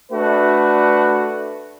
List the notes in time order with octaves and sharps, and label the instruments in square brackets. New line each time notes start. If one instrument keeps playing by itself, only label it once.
[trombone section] A3 D4 F#4 B4